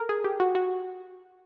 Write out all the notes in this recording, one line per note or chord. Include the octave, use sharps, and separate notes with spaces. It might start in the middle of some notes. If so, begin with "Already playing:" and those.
Already playing: A4 A#4
G#4
G4
F#4
F#4